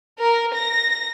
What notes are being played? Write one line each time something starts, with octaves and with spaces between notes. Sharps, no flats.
A#4
A#6